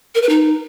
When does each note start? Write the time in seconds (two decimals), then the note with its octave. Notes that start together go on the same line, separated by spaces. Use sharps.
0.15 A#4
0.22 B4
0.29 D#4